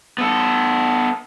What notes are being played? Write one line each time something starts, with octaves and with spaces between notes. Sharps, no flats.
B3 A4